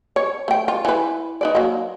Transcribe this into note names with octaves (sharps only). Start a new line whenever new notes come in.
C#5
A3 G5
F4
E3 B4
D#4 B4 D5
F#3 A#3